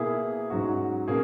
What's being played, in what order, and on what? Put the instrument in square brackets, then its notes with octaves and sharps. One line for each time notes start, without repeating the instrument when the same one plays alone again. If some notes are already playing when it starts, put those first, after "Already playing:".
Already playing: [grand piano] B2 A#3 E4 G#4
G#2 F#3 C#4 F#4
B2 A#3 C#4 G#4